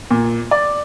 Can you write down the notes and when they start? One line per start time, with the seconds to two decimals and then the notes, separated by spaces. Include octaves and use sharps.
0.11 A#2
0.51 D5